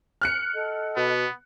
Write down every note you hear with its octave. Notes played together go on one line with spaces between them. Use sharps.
F6 F#6 C#7
A4 D#5 F#5
B2 B3